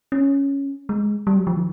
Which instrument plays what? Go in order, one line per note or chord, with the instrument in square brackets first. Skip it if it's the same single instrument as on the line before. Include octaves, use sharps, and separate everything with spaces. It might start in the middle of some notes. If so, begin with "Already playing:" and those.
[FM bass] C#4
G#3
G3
F#3
F3
D#3